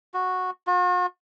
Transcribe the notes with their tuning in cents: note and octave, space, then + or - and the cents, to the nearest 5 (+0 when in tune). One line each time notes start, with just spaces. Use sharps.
F#4 -10
F#4 -45